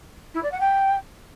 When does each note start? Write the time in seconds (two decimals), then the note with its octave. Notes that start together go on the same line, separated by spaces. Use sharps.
0.34 E4
0.43 D5
0.51 F#5
0.60 G5